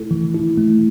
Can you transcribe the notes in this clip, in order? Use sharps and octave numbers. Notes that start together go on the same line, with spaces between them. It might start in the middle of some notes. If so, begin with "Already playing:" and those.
Already playing: A3 E4 A4
E3
E4
A3